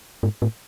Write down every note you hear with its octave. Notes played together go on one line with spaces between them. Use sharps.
G#2
A2